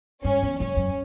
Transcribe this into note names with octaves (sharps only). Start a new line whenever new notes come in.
G2 C#4
E2
F#2 C#4
F#2